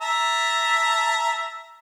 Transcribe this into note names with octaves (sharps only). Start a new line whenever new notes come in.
E5 A5 A#5